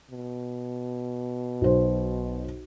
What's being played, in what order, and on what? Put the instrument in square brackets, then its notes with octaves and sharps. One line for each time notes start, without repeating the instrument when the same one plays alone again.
[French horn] B2
[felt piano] B1 C5